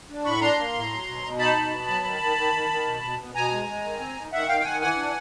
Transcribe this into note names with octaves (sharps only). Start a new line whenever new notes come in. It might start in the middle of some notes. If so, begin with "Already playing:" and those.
D4
A2 B5 C#6
D4 A#5 C6
A#3
A2
F#3
B2
B2
D#4 A5 B5
B2
B3
F#3
D#3
D#3
D#3
D#3
D#3
B2
B2
B2
B2 G#5 A#5
G#3
G#3
D#3
C4
D#3
D#3 E5 F#5
D#3 F5 G5
G5
D#3 F#5 G#5
E3 F#5 G#5
D4